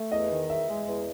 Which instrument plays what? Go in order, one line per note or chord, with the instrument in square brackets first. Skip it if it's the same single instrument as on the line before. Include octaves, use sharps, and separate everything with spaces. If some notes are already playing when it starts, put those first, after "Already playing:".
Already playing: [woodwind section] A3
[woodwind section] E2 [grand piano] D#5
[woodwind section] D#3
[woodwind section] E2 [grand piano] E5
[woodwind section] G#3
E2